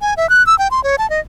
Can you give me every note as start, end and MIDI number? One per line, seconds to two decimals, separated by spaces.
0.01 0.14 80
0.17 0.29 76
0.30 0.45 90
0.47 0.58 88
0.59 0.68 79
0.71 0.83 84
0.84 0.96 73
0.98 1.09 81
1.10 1.20 75